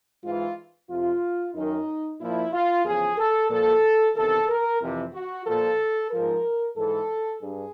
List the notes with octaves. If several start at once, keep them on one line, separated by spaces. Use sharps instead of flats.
G#2 E3 F4
F2 C3 F3 F4
F#2 D#3 D#4
A#2 F3 E4
F4
E2 C#3 F3 G#4
A4
A#2 F3 A4
E2 C3 D#3 A4
A#4
F2 C3 E3
F#4
A#2 F3 A4
G#2 F3 A#4
G#2 E3 A4
G2 G#4